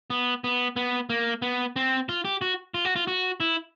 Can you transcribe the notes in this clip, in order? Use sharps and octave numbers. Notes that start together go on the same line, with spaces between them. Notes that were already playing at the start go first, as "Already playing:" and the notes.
B3
B3
B3
A#3
B3
C4
F4
G4
F#4
F4
F#4
F4
F#4
E4